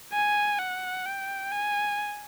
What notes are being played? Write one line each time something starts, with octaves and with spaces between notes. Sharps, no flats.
G#5
F#5
G5
G#5